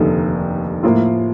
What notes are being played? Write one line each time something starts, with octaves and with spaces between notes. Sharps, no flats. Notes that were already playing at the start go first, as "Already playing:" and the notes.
Already playing: F1 D#2 D3 A3 D#4
A2 F3 A#3 F4